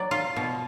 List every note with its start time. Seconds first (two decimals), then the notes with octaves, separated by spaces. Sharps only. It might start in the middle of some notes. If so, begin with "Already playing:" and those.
Already playing: F#3 D5
0.11 F4
0.36 B2